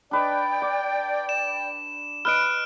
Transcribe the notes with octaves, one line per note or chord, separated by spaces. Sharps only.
D4 B4 D5 D#5 G5
D6
E7
B4 D#5 F6 F#6 D7